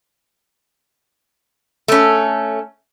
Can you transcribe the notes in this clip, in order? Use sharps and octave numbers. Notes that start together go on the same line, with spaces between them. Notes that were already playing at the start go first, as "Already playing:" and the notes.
A3 C#4